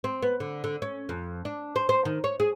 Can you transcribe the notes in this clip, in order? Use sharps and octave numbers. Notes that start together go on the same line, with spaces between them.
C4
B3
D3
D3
C#4
F2
D4
C5
C5
D#3
C#5
G#4